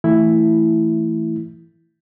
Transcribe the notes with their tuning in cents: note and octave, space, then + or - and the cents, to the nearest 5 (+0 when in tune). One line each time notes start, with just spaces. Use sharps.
E3 -5 A3 +10 E4 +0